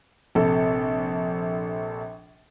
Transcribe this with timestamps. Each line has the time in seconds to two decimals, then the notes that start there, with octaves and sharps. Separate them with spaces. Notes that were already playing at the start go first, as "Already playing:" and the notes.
0.35 A#1 C3 A4